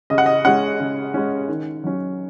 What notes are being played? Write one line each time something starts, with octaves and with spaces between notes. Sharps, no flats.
C#3 D#5
F#5
D#5
G#3 C#4 F#5
C#3
G#3 C#4
D#3
F#3 C#4